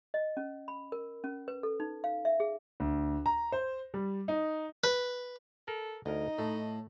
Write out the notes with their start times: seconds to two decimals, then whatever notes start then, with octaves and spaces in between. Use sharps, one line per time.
0.14 D#5
0.37 C#4
0.68 B5
0.92 A#4
1.24 C#4
1.48 B4
1.63 A4
1.80 D#4
2.04 F5
2.25 E5
2.40 G#4
2.80 D2
3.26 A#5
3.52 C5
3.94 G3
4.28 D#4
4.84 B4
5.68 A4 A#4
6.06 D2 D#4 A#4 D#5
6.38 A2 A3